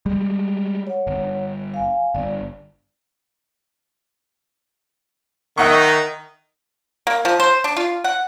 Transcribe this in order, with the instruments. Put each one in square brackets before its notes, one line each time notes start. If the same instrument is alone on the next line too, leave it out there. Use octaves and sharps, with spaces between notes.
[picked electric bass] G3 G#3
[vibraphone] C#5 F#5
[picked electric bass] G1
[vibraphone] F5 G#5
[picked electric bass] G1 [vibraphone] D5
[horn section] D#3 D#4 [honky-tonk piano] E5 F#5 C#6
[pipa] A#3
F3
C5
D4
F4
F#5